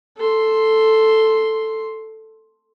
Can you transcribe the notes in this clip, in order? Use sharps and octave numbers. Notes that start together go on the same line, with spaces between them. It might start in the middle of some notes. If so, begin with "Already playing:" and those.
A4 C6